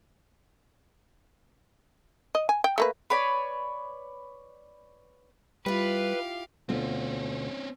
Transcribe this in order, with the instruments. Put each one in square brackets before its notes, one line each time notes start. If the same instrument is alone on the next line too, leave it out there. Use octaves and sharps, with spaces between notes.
[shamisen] D#5
G#5
G5
A3 A#3 B4
[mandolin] B4 C#5 D5 B5
[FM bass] G3 [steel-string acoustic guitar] E4 F4 [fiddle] G4 F5 [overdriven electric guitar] B4
[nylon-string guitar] D2 B2 F4 [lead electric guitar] C4 C#4